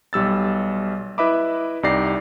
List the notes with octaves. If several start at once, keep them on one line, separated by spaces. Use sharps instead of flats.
B1 G3 E6 A6
E4 B4 D#5 E5 B5 D6
C2 D#4 G4 D5 A#6 C7